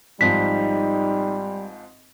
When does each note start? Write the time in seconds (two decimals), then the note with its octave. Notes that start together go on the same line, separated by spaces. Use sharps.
0.21 G#1 G#2 F3 G3 D#4 B6